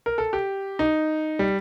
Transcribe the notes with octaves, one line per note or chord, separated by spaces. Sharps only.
A#4
A4
G4
D#4
G3